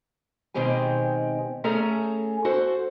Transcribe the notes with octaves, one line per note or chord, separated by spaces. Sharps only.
B2 D#3 G#3 C4 G4 G#5
A3 C#4 G#4 A4 G#5 A#5
F#4 A4 C5